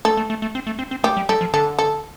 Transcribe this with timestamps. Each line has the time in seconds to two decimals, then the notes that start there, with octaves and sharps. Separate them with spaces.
0.05 A3 A4
0.17 A3
0.30 A3
0.42 A3
0.55 C4
0.67 A3
0.79 C4
0.91 C4
1.04 A3 G4
1.17 G3
1.29 G3 A4
1.41 F3
1.54 D3 A4
1.79 A4